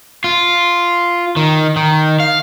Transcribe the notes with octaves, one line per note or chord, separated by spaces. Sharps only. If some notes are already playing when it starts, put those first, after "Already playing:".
F4
D#3
D#3
F5